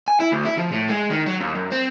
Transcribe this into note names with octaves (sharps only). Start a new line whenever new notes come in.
G#5
E4
D2
E4
F3
A2
G#3
D#3
F#3
D#2
F#2
C4